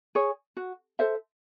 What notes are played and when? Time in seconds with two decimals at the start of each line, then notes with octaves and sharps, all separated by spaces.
0.15 G#4 C#5
0.57 F#4
0.99 A4 C5 E5